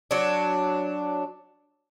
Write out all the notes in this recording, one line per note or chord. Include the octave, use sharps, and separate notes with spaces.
F#3 D4